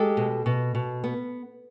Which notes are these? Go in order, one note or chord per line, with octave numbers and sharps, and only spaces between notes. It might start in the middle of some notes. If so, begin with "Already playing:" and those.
Already playing: G#3 G4 A4
B2
B2
B2
B3